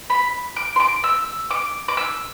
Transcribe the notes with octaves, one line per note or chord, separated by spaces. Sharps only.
B5
D6
C6
D6
E6
D6
D6
E6